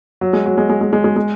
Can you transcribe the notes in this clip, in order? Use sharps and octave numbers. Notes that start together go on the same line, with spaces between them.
F#3
G#3
F#3
G#3
G#3
G#3
G#3
G#3
G#3